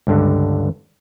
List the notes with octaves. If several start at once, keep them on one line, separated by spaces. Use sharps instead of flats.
C#2 G2 D3